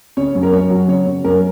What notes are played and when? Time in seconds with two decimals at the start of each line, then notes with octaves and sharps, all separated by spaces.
0.17 C#3 C#5
0.35 F#2
0.43 A#4
0.53 F#2 C#5
0.71 F#3
0.88 C#3 C#5
1.06 C#3
1.24 F#2 A#4